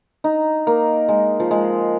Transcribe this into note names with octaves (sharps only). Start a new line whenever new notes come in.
D#4
A#3
G#3
F3
G#3